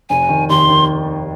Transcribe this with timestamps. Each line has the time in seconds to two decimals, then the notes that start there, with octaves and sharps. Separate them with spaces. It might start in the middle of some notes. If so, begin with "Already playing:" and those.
0.09 F1 G#5
0.29 D#3
0.49 D#2 C6
0.69 D#3